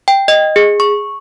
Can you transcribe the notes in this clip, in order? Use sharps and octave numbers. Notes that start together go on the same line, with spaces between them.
G5
D#5
G#4
C#6